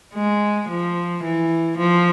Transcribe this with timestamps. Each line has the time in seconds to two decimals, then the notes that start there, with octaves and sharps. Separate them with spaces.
0.14 G#3
0.69 F3
1.24 E3
1.78 F3